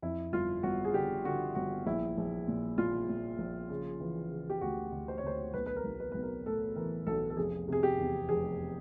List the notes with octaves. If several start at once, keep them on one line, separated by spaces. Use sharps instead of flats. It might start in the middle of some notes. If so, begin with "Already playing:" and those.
F2 E4
G1 F4
G1 F#4
G#4
D3 G4
D3 F#4
G1 F#4
A#1 E4
A#1
A#2
A#2 F4
A#2
A#1
C#3
E3
C#3
G4
D2 F#4
D2
C5
C#5
D2 C5
B1 B4
B4
A#4
B1
B4
B1 B4
A#4
A2 A4
E3 A#4
B1 A4
A4
F1 G#4
C3 G#4
G4
E2
F1 G#4